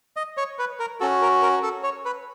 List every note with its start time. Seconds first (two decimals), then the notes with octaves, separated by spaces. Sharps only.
0.17 D#5
0.37 C#5
0.59 B4
0.80 A#4
1.00 C#4 F#4 A4
1.22 A#4
1.42 A#4
1.63 A4
1.83 C#5
2.05 B4